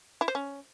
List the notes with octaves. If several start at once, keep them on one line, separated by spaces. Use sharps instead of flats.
E4
C5
C#4